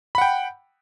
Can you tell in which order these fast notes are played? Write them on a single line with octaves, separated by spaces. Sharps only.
B5 F#5 G5